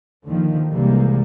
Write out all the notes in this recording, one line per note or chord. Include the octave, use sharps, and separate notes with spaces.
D#2 D3 D#3 F3
C2 C3 E3 G3 G#3 A#3